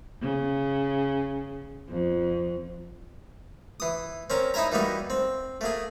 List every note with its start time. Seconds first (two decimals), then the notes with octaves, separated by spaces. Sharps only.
0.21 C#3
1.89 F2
3.80 E3 D#6
4.30 C4 C#4 A#4
4.54 D#4 E4 E5 G#5 A#5
4.72 E3 G3 A#3 D#4 F#4
5.10 C4
5.61 A3 A#3 G#4